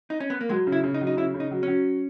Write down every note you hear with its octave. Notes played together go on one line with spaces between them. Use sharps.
D#4
C#4
B3
A#3
F#3 G#3
C#3
E4
C#3
D#4
F#3
D#4
C#3 E4
C#3
D#4
F#3
F#3 C#4